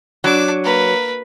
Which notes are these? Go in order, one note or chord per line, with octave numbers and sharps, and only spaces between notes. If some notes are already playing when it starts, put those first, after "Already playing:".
F#3 D4 D6
A#3 B4